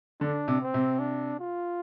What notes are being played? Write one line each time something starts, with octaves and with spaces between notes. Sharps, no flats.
D3 D4
C3
C4
C3
D4
F4